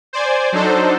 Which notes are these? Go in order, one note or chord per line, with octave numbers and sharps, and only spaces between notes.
C5 D5 G#5
F#3 D4 D#4 A4 C5